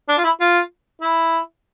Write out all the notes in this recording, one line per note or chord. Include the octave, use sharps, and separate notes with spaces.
D4
F4
E4
F4
E4